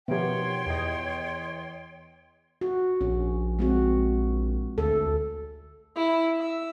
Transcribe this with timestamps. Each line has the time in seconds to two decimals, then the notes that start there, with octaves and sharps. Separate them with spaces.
0.08 B2 D#3 F3 B3 G4 C#5 G5 C6
0.66 E2 D#5
2.61 F#4
3.01 A#1 C#4
3.59 G#3 C4 F#4
4.78 D2 A4
5.96 E4
6.39 E5